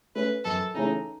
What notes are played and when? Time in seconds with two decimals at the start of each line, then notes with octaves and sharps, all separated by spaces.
0.15 A3 C#4 B4
0.45 F#2 A4
0.74 C#3 E3 A3 C#4 D#4